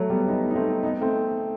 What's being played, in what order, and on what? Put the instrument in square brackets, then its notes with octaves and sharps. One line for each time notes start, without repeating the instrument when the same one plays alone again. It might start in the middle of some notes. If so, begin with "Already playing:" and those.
Already playing: [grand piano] F#3 A3
G3 B3
B3 D#4
D#4
A3 C4
B3 D#4
A3 C4